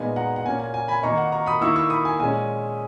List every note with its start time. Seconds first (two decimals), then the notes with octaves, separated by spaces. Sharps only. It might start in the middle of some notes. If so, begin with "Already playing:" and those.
Already playing: A#2 G#3 B3 D#4 G#5
0.16 F#5 A#5
0.36 F#5
0.45 A#2 A#3 C#4 G#5
0.59 G#5
0.74 G#5
0.88 G#5 B5
1.03 D#3 A#3 D#4 A#5 C#6
1.18 F#5
1.32 A#5 C#6
1.46 B5 D#6
1.61 D#3 A#3 E4 C#6 E6
1.76 C#6 E6
1.90 B5 D#6
2.05 G#5
2.19 A#2 G#3 C#4 G#5